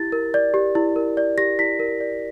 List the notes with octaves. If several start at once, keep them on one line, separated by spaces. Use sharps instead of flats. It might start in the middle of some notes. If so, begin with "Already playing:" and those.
Already playing: E4 G4 A6
A#4
D5
G4
E4
A#4
D5
G4 A#6
E4 B6
A#4
D5